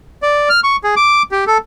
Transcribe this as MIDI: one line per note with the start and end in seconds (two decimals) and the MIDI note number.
0.22 0.49 74
0.49 0.60 89
0.64 0.76 85
0.84 0.95 68
0.96 1.23 86
1.32 1.44 67
1.47 1.58 69